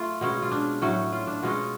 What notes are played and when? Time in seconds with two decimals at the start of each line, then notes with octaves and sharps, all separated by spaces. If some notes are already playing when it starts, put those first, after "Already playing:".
Already playing: A3 F4
0.21 B2 G#3 C#4
0.42 F4
0.51 D4
0.82 A2 F#3 C#4
1.12 F4
1.27 D4
1.43 B2 G#3 C#4 F4